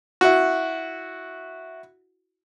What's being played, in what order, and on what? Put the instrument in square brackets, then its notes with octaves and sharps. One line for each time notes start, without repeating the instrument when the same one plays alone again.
[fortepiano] E4 F#4